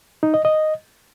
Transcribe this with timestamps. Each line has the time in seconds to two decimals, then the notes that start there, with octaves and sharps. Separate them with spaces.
0.23 D#4
0.34 D#5
0.45 D#5